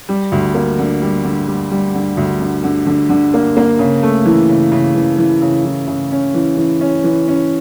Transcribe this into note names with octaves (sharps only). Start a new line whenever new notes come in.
G3
D2
A#3
D3
G3
D3
G3
G3
D3
D2
D3
D3
D3
D3
A#3
A#3
C#3
A3
E3
C#3
C#3
E3
E3
C#3
E3
C#3
C#4
E3
E3
C#4
E3
C#4